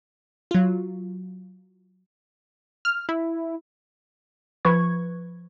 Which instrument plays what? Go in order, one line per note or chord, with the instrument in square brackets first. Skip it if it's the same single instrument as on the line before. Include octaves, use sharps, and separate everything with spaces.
[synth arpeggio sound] F#3 F4
F6
E4
[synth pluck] F3 B4 C#6 G#6